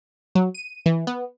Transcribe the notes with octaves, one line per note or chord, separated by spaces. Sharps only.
F#3
D#7
E3
B3